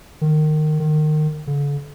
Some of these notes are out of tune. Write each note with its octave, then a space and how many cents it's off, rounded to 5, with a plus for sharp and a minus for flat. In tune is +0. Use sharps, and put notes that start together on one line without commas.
D#3 -20
D#3 -25
D3 -45